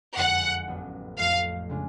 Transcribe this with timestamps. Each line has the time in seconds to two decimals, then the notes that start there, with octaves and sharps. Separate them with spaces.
0.16 F#1 F2 D3 G#3 F#5
0.68 A1 A2 F#3 B3 D4
1.19 F2 F3 A3 F5
1.69 C#3 G#3 D4 F4